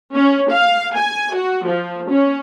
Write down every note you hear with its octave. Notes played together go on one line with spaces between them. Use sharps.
C#4
F5
G#5
F#4
F3
C#4